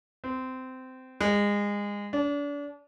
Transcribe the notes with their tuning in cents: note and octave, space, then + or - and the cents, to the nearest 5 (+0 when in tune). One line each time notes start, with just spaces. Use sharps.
C4 -20
G#3 -25
D4 -35